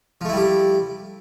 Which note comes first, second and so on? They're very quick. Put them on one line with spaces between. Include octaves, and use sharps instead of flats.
F3 A3 E4 G3 G4